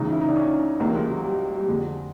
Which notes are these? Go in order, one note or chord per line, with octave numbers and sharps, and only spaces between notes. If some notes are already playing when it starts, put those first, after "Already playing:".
Already playing: C#2 C#3 E3 D#4
E4
D#4
D4
C#4
C#2 C3 E3 A#3
G#3
F#3
G3
G3
F2 D3 G#3